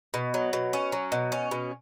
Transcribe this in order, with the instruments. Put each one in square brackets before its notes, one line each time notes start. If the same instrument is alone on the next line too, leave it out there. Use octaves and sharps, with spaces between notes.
[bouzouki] B2
F#3
B2
C#4
F#3
B2
C#4
B2